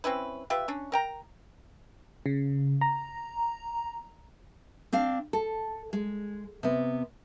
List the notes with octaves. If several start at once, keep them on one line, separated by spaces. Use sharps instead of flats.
C4 C#4 E4 B4
F4 G4 B4 E5
C#4 D4
A#4 G5 A#5
C#3
A#5
C4 D4 F5
A4
G#3
C3 B3